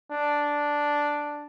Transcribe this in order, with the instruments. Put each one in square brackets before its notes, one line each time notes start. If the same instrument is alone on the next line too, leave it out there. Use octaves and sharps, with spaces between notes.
[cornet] D4